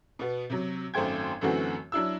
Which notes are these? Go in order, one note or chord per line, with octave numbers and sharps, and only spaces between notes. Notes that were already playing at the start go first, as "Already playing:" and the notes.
B2 B3
C3 F#3
G#1 F#2 A3 C5 G5 G#6
F#2 D3 E3 A3 C4 F#4
F#3 D4 E4 E6